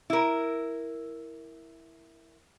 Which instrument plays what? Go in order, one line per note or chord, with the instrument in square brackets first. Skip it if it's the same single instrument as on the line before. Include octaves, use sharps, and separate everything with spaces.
[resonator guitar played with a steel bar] E4 A#4